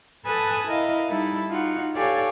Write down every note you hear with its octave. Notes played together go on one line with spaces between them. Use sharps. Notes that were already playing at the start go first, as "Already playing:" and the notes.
A4 B4 G#5 A5 D#6 F#6
E4 A#4 D#5 F5
G3 D#4 E4 A4
D#4 F4 F#4 F#5
G4 A4 C#5 D5 F5 G#5